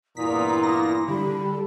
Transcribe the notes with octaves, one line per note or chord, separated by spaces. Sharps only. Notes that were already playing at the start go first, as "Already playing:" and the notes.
E2 G2 A#2 E4 A#5 D#6 B6
A#6
D3 G3 B5